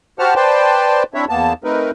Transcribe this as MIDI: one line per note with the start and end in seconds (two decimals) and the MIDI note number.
0.19 0.34 66
0.19 0.34 67
0.19 0.34 72
0.19 0.34 78
0.19 0.34 81
0.19 0.34 89
0.36 1.03 71
0.36 1.03 72
0.36 1.03 74
0.36 1.03 79
0.36 1.03 81
0.36 1.03 84
1.14 1.25 60
1.14 1.25 62
1.14 1.25 64
1.14 1.25 73
1.14 1.25 76
1.29 1.53 40
1.29 1.53 58
1.29 1.53 59
1.29 1.53 81
1.64 1.91 57
1.64 1.91 60
1.64 1.91 63
1.64 1.91 70
1.64 1.91 71